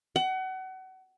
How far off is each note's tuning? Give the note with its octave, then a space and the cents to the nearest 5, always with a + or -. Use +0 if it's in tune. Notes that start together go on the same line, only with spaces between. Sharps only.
F#5 +30